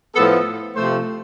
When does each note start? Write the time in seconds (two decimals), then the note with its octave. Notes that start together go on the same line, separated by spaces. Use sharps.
0.15 A2 F3 B3 A4
0.76 C3 F3 A3 C5